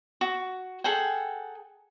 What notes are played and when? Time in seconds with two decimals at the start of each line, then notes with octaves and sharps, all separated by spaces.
0.21 F#4
0.84 G#4 A4 F#5 G5